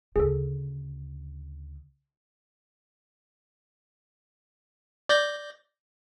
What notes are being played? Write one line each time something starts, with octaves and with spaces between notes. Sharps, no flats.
D2 C#3 G#4 A4
D5 G6 A#6